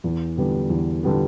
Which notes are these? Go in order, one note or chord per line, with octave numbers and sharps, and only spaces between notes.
E2
D3 G3 B3
E2
D3 G3 B3